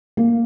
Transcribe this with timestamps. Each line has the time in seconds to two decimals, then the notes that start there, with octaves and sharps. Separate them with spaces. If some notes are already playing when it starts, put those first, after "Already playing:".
0.17 A#3